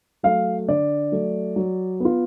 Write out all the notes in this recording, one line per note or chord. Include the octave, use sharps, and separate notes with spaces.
F#3 A3 F5
D3 D5
F#3 A3
F#3
B3 F4